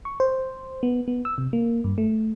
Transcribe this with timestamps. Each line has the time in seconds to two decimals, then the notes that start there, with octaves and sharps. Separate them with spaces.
0.05 C#6
0.20 C5
0.83 B3
1.08 B3
1.25 E6
1.38 C3
1.53 A#3
1.84 G2
1.98 A3